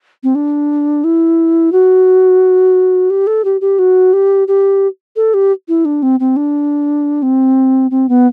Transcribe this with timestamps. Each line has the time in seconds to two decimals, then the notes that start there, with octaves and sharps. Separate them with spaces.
0.24 C4
0.35 D4
1.04 E4
1.72 F#4
3.10 G4
3.27 A4
3.45 G4
3.61 G4
3.79 F#4
4.13 G4
4.48 G4
5.16 A4
5.34 G4
5.68 E4
5.85 D4
6.03 C4
6.20 C4
6.36 D4
7.23 C4
7.91 C4
8.09 B3